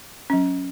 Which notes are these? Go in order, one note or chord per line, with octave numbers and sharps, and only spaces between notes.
F#3 C#4